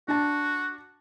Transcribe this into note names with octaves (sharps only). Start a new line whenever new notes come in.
D4 F#4 A5